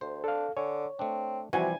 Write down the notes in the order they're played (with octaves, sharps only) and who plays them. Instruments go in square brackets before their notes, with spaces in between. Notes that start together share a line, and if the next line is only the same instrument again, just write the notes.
[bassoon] D2 [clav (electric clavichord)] C5
[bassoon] D4 [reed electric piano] A4 F5
[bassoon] D3 [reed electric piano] C#5 [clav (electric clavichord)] G#5
[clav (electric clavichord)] A3 D4 [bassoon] C4
[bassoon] C3 [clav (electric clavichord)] E3 F3 G3 [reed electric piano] F#4 [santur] G#5